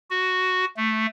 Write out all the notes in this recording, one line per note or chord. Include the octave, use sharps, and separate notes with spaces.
F#4
A3